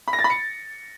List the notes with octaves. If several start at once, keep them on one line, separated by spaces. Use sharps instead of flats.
B5
A#6
A6
B5
C#7